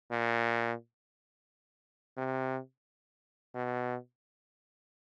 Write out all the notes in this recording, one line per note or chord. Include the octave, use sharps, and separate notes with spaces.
A#2
C3
B2